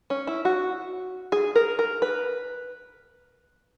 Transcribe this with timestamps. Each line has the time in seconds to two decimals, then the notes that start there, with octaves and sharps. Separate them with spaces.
0.10 C#4
0.27 E4
0.45 F#4
1.32 G#4
1.55 A#4
1.79 A#4
2.02 B4